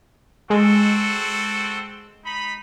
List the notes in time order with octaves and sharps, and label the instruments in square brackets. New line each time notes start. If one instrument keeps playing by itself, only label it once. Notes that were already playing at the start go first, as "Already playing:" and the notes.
[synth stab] G#3 [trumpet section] C4 F#4 A4
[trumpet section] D#4 B5